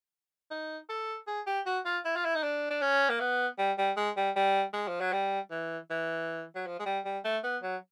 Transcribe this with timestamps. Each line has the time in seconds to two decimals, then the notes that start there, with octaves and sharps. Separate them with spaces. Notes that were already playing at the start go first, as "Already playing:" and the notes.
0.51 D#4
0.89 A4
1.27 G#4
1.47 G4
1.66 F#4
1.85 F4
2.05 E4
2.16 F4
2.25 E4
2.35 D#4
2.43 D4
2.70 D4
2.82 C#4
3.09 A#3
3.20 B3
3.59 G3
3.78 G3
3.97 G#3
4.17 G3
4.36 G3
4.74 G#3
4.88 F3
5.00 F#3
5.13 G3
5.51 E3
5.90 E3
6.55 F#3
6.67 F3
6.79 G#3
6.86 G3
7.05 G3
7.24 A3
7.44 B3
7.63 F#3